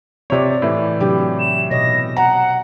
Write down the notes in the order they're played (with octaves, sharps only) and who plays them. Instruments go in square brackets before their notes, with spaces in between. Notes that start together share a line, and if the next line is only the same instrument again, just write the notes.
[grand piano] C3 C#5 [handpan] C4 F4 D5
[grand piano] A2 E3
[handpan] C3 F#3 D4 [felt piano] G4
[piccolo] E7
[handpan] B2 C#5 D#5 [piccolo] A#6
[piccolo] F#5 [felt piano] A#5